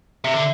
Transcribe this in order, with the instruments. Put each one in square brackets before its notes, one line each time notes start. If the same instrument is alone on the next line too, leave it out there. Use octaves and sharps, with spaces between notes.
[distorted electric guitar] C3 [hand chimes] E5
[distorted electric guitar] D3